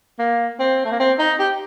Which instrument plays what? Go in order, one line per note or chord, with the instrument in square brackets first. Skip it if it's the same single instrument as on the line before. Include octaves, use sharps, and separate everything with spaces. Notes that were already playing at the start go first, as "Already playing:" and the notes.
[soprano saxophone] A#3
C4
A3
A#3
C4
D#4
G4